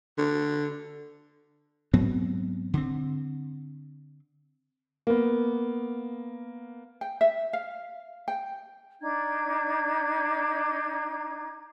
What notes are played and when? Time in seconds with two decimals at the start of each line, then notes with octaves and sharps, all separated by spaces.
0.18 D3
1.93 G#2 F#3 B3 C4
2.74 D3 C4
5.07 A#3 B3
7.01 G5
7.21 E5
7.53 F5
8.28 G5
9.01 D4 D#4 G#6